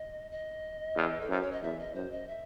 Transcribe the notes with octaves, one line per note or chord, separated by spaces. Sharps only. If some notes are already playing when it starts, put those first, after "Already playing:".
Already playing: D#5
D#5
E2
A4
F#2 C5
C#5
D#5
E2 E5
D#5
F#2 C5
D#5
E5